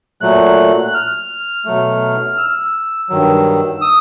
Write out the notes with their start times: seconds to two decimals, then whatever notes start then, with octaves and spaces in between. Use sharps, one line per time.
0.21 A#2 F#3 A3 F#6
0.88 F#6
0.94 F6
1.65 B2 F#3 A3
2.37 E6
3.09 G2 D#3 F#3
3.81 D#6